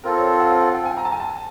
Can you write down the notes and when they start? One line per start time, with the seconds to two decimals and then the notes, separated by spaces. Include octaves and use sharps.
0.04 C4 F4 A4 A#4
0.17 C#5
0.27 C5
0.39 F#5
0.51 F5
0.62 F#5
0.74 G5
0.85 G#5
0.97 A#5
1.05 A5
1.12 G#5
1.20 A5